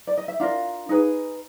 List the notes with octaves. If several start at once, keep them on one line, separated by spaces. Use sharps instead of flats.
D5
D#5
E5
D4 F4 A#4 F5
D#4 G#4 B4